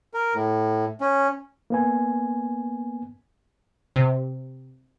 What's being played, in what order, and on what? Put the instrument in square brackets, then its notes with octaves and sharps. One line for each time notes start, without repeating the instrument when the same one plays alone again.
[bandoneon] A#4
A2
C#4
[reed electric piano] A#3 B3 G#5
[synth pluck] C3